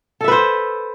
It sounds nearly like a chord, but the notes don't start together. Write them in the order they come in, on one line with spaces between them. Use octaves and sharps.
A4 E5 B4 C5